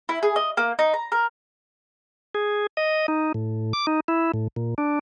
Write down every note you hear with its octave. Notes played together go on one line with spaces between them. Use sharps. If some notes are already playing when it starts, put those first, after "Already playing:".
E4
G#4
D#5
A#3
D#4
A#5
A#4
G#4
D#5
D#4
A2
D6
D#4
E4
A2
A#2
D4